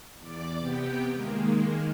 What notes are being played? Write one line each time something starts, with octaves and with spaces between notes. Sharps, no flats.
E2 D5 D6
C3 B3 G4 G5
D#3 G#3 A#3